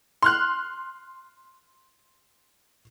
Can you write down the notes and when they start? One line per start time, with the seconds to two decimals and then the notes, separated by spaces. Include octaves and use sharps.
0.23 C6 F6 F#6